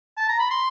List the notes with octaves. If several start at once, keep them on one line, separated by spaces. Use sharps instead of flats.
A5
A#5
B5
C6